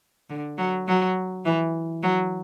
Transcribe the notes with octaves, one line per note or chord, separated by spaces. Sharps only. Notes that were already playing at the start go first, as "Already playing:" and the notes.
D3
F#3
F#3
E3
F#3